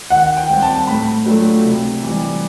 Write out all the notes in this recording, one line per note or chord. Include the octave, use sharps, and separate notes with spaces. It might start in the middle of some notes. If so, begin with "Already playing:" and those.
D#3 F#5
G5
G3 C4
A5
A2 B5
F#3 A3 D4 F4
C3
E3 G3